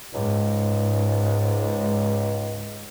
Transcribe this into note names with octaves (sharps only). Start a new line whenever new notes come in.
C#2 G#2